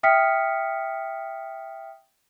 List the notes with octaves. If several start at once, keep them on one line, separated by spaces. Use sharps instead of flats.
E5 G5 D#6 F6 B6 C#7